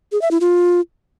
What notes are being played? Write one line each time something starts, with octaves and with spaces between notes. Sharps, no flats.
G#4
E5
E4
F4